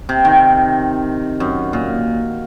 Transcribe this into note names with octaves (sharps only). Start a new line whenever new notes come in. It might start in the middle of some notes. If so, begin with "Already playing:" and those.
C3
D#3
F#2
A#2